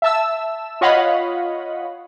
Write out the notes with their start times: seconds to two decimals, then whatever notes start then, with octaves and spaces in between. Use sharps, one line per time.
0.02 E5 A5 E6
0.81 F4 C#5 D#5 F5 F#5 B5